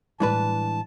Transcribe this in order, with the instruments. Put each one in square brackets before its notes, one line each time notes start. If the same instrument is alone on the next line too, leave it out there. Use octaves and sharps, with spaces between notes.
[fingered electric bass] A2 G3 G#3 [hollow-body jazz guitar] E3 D4 B4 [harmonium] A5